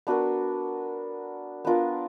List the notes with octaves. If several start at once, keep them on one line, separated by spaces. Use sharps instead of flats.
B3 D4 F#4 A#4
B3 D4 F4 A#4